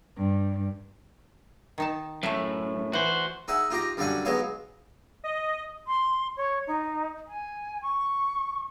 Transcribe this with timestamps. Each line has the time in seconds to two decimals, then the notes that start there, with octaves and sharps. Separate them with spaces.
0.16 G2
1.78 D#3 D#4 A5
2.23 F#2 A2 A3 E5
2.93 E3 F#4 C5
3.48 D#4 G#4 E5 F#5
3.70 D#4 F4 G4 A#5
3.97 F#2 D3 G3 F5 F#5 G#5
4.25 F#3 G#3 B3 D#4 C#5 F5
5.24 D#5
5.87 C6
6.37 C#5
6.67 D#4
7.28 G#5
7.82 C#6